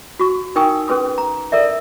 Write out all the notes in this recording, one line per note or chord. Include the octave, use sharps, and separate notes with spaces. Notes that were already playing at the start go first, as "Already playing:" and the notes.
F#4 C#6
D#4 A#4 G5 G#5 C#6 D#6
C#4 G#4 B4 C6 D#6
A#5
A4 A#4 D5 E5